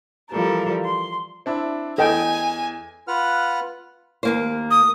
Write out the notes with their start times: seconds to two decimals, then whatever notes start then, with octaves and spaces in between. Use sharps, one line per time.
0.31 E3 F3 G3 A4 A#4
0.86 C6
1.46 C4 D4 E4
1.98 E2 A4 D#5 G5 G#5
3.08 F4 B4 F#5 F6
4.23 D#2 A#3 C5
4.71 D#6